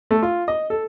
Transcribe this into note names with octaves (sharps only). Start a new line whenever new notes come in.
A3
F4
D#5
A4